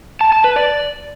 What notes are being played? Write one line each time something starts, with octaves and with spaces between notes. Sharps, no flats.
A5
A5
B4
D5